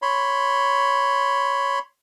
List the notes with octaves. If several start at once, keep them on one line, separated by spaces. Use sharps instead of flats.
C#5 B5 C6